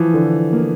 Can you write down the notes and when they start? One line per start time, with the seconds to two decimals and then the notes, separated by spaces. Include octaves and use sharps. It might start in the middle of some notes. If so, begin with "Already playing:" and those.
Already playing: E3 F3
0.14 D3
0.53 A#3